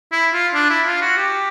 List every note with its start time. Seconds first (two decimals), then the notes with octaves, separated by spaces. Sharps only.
0.12 E4
0.33 F4
0.54 D4
0.70 E4
0.86 F4
1.02 F#4
1.17 G4